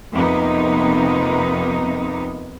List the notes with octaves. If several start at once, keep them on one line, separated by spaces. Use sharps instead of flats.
F2 C3 A#3 B3 D#4